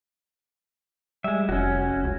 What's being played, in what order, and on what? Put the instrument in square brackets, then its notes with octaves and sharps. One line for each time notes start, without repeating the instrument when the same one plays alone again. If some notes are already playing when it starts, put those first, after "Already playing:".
[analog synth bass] G3 [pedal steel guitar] G#3 E5
[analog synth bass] F1 [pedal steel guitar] C#4 F#4
[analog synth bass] C#2